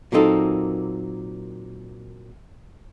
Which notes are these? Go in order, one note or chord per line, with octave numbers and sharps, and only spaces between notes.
A#2 F#3 A#3 C4 D#4 A4